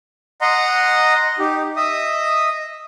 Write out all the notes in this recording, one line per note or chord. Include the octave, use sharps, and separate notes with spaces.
D#5 F#5 A#5 C6
D#4 G4
D#5 E5 D#6